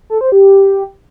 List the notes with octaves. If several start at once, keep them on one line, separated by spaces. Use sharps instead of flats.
A4
C5
G4